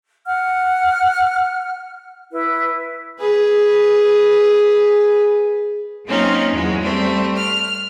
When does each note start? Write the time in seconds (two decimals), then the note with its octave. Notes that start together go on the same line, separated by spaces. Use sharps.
0.26 F#5 F6
2.31 E4 B4
3.20 G#4 B4
6.06 F#3 A#3 C4 C#4 D#4 F4
6.52 E2 F#3 G#3
6.80 G3 A3 C4
7.37 F6